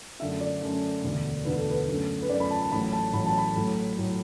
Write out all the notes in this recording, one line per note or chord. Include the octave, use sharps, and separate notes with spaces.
F#2 D3 A3 D4 E5
D5
F#2 D3 A3 D4
E1 D2 D3
E1 D2 D3 B4
A4
B4
F#2 D3 A3
B4
F#2 D3 A3 D5
B5
A5
A5
A1 A2 F#3 A3 B5
A5
A1 A2 F#3 A3 B5
A5
B5
A2 F#3 A3
A2 F#3 A3